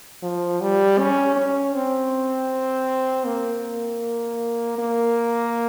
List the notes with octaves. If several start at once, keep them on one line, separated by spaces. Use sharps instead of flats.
F3
G3
C#4
C#4
C4
A#3
A#3